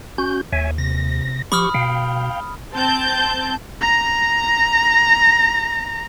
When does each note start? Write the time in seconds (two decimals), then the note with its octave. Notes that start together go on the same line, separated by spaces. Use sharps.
0.18 C#4 F#4 G6
0.52 D#2 C#5 E5 G#5
0.78 C3 A#6
1.52 F3 G4 B5 C#6 D#6 F6
1.74 B2 F5 G5
2.74 C4 A5 G6
3.82 A#5 A#6